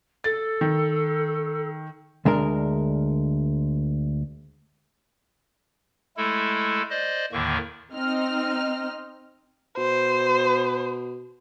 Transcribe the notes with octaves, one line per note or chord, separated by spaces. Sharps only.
A4 A6
D#3
D2 G#3 D4 A#4
G#3 A3 E4 A4
C5 D5 D#5
D#2 A2 D3 D#3 A#3 C#6
C4 D#4 D#5 F6
B2 C5